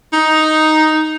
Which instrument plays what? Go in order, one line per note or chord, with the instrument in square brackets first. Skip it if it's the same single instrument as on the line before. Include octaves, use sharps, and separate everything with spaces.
[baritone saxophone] D#4